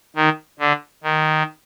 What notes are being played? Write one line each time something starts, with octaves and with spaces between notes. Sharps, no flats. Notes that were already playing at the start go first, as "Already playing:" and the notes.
D#3
D3
D#3